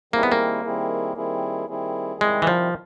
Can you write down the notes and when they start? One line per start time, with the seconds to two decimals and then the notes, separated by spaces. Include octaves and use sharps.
0.13 D#3 G3 A#3 C4 E4 G#4
0.23 B3
0.32 A#3
0.65 D#3 G3 C4 E4 G#4
1.17 D#3 G3 C4 E4 G#4
1.68 D#3 G3 C4 E4 G#4
2.21 C3 D#3 G3 G#3 C4 E4
2.42 E3
2.47 F3